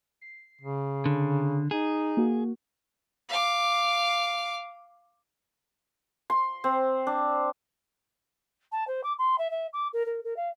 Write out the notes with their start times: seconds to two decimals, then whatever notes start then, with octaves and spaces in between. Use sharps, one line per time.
0.21 C7
0.61 C#3
1.06 D3
1.71 D#4 G#4
2.17 A#3 F#4
3.29 F5 D6
6.30 C6
6.64 C4
7.07 D4
8.72 A5
8.87 C5
9.04 D6
9.19 C6
9.38 E5
9.51 E5
9.73 D6
9.93 A#4
10.06 A#4
10.24 A#4
10.37 F5